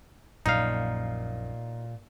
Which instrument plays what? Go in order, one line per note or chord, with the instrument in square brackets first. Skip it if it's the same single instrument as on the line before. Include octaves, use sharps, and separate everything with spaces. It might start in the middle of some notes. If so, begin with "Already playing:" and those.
[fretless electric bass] A#1 F#2 [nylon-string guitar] A#2 [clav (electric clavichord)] D#4 F5